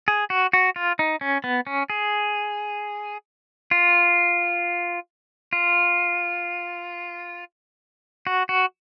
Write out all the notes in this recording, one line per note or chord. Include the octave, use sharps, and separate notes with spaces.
G#4
F#4
F#4
F4
D#4
C#4
B3
C#4
G#4
F4
F4
F#4
F#4